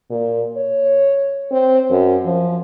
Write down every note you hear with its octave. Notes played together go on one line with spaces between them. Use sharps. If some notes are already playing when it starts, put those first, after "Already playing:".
A#2
C#5
C4
F#2
F3